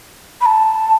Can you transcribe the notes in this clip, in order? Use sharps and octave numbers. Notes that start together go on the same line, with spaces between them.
B5
A5